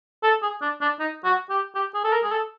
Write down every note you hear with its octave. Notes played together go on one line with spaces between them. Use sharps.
A4
G#4
D4
D4
D#4
F#4
G4
G4
G#4
A4
A#4
G#4
A4